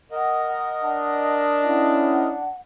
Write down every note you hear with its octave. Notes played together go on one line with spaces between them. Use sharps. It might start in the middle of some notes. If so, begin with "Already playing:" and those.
A#4 D#5 F#5
D4
C#4 E4 F#5